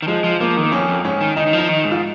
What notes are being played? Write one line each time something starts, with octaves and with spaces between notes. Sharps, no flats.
D#3
F3 G#3
F3
F3 A#3
D#3
A#3
F2 C#4
F2
G#2 C#4
D#3
D#3 D#4
D#3
F3
D#4
D#3
G#2
F4